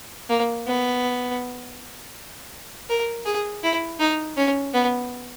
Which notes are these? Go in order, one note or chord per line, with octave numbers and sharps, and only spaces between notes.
A#3
B3
A#4
G#4
E4
D#4
C#4
B3